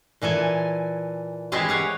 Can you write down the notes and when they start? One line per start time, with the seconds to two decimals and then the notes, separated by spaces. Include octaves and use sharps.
0.22 A#2 E3 A4 G#5
1.52 E3 G#3 C4 E4 G4 G#4
1.69 C#5 F5 F#5